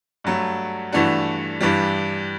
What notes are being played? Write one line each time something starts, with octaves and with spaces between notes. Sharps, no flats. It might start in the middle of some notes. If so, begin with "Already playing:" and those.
G2 F#3 A3
G2 E3 A3 D4 F#4
G2 E3 G3